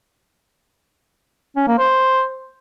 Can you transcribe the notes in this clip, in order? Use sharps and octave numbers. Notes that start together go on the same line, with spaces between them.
C#4
A#3
C5